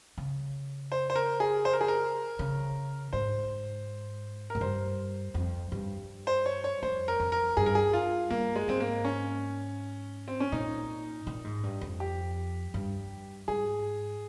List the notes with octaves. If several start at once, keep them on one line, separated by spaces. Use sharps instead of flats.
C#3
C5
C5
A#4
G#4
C5
A#4
G#4
A#4
C#3
G#2 C5
G#2 A#4
G2 C5
F2
G2
C5
C#5
C#5
F2 C5
A#4
F2
A#4
G2 G#4
A#4
G#4
F4
G2 A#3
G#3
G#2 C4
A#3
C#4
C4
C#4
A#2 D#4
A#2
G#2
G2
F2
G4
G2
G#2 G#4